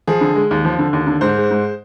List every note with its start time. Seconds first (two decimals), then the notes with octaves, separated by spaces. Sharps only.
0.07 F3 G#4
0.21 D3
0.35 G#3
0.51 D#2
0.65 F3
0.79 D3
0.93 D#2
1.07 D3
1.21 G#2 C5
1.36 G#3
1.51 G#2